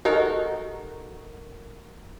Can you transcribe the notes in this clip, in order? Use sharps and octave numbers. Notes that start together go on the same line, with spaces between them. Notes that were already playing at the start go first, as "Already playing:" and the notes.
D#4 F#4 G4 A4 A#4 D#5